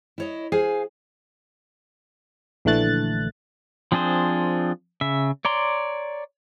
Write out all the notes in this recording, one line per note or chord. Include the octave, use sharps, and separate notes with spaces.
E4 C#5 D#5
G#4 C5 F5 G#5
A#1 D3 E3 A3 F#6 A6
F3 C4 D4 G#4 C5
C#3 E5
C#5 D5 A#5 C6